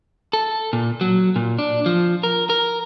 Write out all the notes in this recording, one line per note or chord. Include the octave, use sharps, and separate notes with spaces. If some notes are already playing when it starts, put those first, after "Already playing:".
A4
A#2
F#3
A#2
D4
F3
A#4
A#4